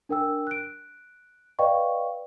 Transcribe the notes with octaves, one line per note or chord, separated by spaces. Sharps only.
D4 A#4 G5 E6
F#6 D7
B4 D5 D#5 F5 G5 C#6